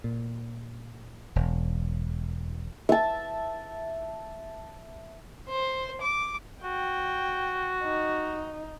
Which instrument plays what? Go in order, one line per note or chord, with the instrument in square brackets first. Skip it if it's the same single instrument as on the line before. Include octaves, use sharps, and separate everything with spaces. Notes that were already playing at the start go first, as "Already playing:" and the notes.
[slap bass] A#2
E1
[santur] E5 A5
[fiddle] C5
D6
[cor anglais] F#4 [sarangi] G5
[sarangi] D#4